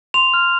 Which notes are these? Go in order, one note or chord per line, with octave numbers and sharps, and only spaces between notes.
C6 F7
F6